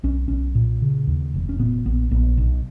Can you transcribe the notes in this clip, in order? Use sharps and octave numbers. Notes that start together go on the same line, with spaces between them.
B1 C#4
B1 C#4
A#2
C#3
D#2
F1
C#4
A#2 B3
A#1 B3
A#1 B3
B1